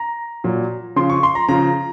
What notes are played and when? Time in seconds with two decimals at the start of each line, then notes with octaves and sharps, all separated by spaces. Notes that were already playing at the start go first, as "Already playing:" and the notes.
Already playing: A#5
0.44 A#2 F#3
0.96 C#3 F3 C6
1.10 C#6
1.23 C6
1.35 A#5
1.49 C#3 F3 A#5